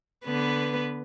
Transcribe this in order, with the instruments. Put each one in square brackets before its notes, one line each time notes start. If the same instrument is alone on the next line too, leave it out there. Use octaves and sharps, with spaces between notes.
[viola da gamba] D3 B3 B4